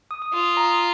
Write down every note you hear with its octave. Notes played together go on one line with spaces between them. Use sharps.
D#6
D#6
F4 D#6
A#5